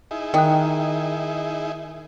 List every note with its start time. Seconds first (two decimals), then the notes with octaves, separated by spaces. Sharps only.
0.11 D#4 E4 G#4
0.34 D#3 G5 D#6 F#6